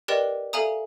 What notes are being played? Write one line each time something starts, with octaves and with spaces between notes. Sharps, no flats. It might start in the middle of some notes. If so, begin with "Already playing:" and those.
G4 A#4 B4 D5 D#5 G5
A4 E5 F5 G#5 A#5 D#6